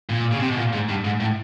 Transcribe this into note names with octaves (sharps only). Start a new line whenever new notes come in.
A#2
C#3
C3
B2
A#2
G#2
G2
G#2
A2